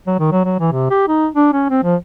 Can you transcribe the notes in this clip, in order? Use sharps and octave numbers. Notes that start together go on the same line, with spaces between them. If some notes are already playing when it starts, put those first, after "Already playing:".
F#3
D#3
F#3
F#3
E3
C3
G4
D#4
D4
C#4
C4
F3